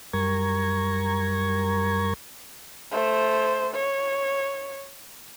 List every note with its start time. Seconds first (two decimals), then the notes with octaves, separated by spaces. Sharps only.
0.13 F#2 G3 A#4 A#5 C#6 G#6
2.91 A3 C5
3.75 C#5